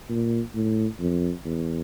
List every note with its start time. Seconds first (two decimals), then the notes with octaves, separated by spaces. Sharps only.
0.09 A#2
0.55 A2
1.00 F2
1.45 E2